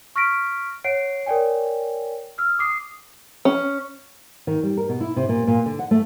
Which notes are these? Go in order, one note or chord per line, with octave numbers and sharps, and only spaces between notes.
C#6 F6 A#6 B6 D7
C#5 F#5 C7 D7
A#4 C#5 D5 G5 G#5
E6 F6
D6 D#6 C7
C#4
D#3
G3
A#4
B2
E4
C3
A#2
A#2
D3
F#5
A3